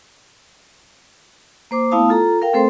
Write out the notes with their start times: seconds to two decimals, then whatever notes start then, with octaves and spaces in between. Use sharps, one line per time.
1.71 A#3 C5 D6
1.91 A3 B3 E4 F5 A5 D#6
2.09 F4 A4 A#5
2.42 A#4 F5 G5
2.53 A3 C4 A4 C5 C6